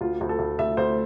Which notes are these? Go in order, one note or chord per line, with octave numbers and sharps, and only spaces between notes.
D2 F4
D2
A4
D2
D2 E5
D2 C5